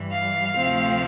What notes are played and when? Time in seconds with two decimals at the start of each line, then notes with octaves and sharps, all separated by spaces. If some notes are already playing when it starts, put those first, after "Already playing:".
Already playing: G2 E3 G3
0.13 F5
0.56 D2 C3 F3 A3 C4